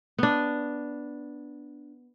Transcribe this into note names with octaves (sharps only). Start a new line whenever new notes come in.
B3 D4